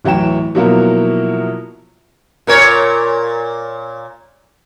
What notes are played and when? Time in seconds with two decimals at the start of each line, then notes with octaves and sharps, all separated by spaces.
0.05 D1 E3 F#3 E4 G5 E7
0.55 B2 F3 F#3 A#3 E4 A#4
2.47 A#2 A#4 C#5